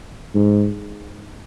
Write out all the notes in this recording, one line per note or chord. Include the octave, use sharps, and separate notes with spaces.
G#2